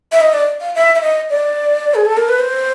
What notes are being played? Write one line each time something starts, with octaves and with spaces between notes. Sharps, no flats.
E5
D#5
D5
F5
E5
E5
D#5
D5
G#4
A4
A#4
B4
C5